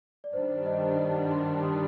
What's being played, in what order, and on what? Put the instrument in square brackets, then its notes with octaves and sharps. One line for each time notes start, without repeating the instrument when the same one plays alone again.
[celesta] D5
[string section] G2 D#3 G3 D4 [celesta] C5
[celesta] D5
C5 D#5
C5 D#5
D5
F#5 A5
A5 C6
C6 D#6